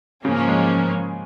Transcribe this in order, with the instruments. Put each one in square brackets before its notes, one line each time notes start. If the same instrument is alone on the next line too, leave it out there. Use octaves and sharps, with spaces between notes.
[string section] G#2 F3 A#3 C#4 [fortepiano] C#3
[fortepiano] G#3